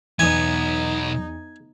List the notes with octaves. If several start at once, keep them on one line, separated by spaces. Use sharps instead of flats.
B1 E2 B3 D#4 G#5